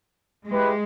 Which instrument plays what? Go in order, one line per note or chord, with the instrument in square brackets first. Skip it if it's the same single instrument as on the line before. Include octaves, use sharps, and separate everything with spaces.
[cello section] G#3 [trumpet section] E4 G4 B4